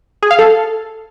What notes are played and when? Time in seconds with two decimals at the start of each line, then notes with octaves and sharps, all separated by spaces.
0.23 G#4
0.31 F5
0.39 A4